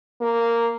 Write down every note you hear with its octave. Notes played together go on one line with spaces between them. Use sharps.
A#3